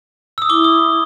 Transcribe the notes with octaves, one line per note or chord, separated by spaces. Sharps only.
D#6 E6
E4 D6 G7
D#6